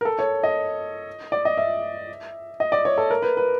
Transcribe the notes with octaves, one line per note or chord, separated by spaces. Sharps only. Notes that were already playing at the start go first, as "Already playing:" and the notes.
A#4
A4
C#5
D#5
D5
D#5
E5
D#5
D5
C#5
A4
A#4
B4
B4